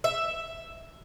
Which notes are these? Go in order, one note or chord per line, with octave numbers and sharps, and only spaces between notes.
E5